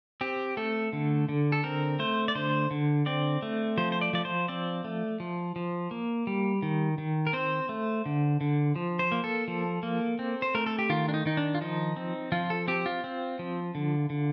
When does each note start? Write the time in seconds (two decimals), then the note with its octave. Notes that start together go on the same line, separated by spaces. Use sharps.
0.21 C4 G4
0.57 A3 A4
0.93 D3
1.29 D3
1.52 A4
1.64 C4 A#4
1.99 A3 C5
2.28 D5
2.35 D3 C5
2.71 D3
3.06 C4 D5
3.42 A3
3.77 F3 C5
3.92 C5
4.01 D5
4.13 F3 D5
4.25 C5
4.48 C4 D5
4.84 A3
5.20 F3
5.56 F3
5.91 A#3
6.27 G3
6.62 D#3
6.98 D#3
7.27 A#4
7.33 C4 C5
7.69 A3
8.06 D3
8.41 D3
8.76 F3
8.99 C5
9.12 A#3
9.24 A4
9.48 F3
9.83 A#3
10.19 C4
10.42 C5
10.55 A3 A#4
10.66 A4
10.79 G4
10.90 D#3 F4
11.09 D4
11.14 D#4
11.26 D#3 D#4
11.37 D4
11.54 F4
11.61 F3 D#4
11.96 C4
12.32 F3 F4
12.50 A4
12.68 C4 G4
12.86 F4
13.04 C4
13.39 F3
13.75 D3
14.10 D3